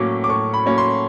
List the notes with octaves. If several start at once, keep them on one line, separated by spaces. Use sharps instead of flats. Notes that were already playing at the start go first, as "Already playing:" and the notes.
Already playing: A2 F#3 A#3 C#4 D6
D6
A2 C#6
B5
F#3 A#3 C#4
C6